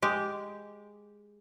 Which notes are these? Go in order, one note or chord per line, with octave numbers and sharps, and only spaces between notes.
G#3 G4